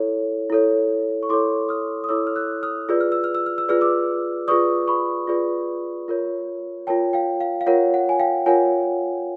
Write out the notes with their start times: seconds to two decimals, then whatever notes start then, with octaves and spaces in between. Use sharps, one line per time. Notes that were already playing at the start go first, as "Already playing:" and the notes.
Already playing: E4 A4 C#5
0.50 E4 A4 C#5
1.23 C#6
1.29 E4 A4 C#5 C6 D6
1.69 D#6 F6
2.04 D#6
2.09 E4 A4 C#5 D6 E6
2.27 F6
2.36 E6 F#6
2.63 D#6 F6
2.89 F4 G#4 B4 D5 E6
3.01 F6
3.12 E6
3.24 F6
3.35 E6
3.46 F6
3.58 E6
3.69 F4 G#4 B4 D5 F6
3.81 D6 E6
4.48 F4 G#4 B4 D5 C#6 D#6
4.88 B5 C#6
5.27 F4 G#4 B4 D5
6.08 F4 A#4 C#5
6.87 F4 A#4 C#5 G5 A5
7.13 F5 G5
7.41 F5
7.61 F5
7.67 F4 A#4 C#5 F#5
7.94 F#5
8.09 G#5
8.20 F5 G5
8.46 F4 A#4 C#5 F#5 G#5